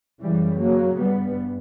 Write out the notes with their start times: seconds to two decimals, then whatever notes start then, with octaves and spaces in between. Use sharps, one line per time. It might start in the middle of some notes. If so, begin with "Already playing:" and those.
0.21 F#2 C#3 E3 G3
0.60 F#3 A#3
0.98 G2 G3 B3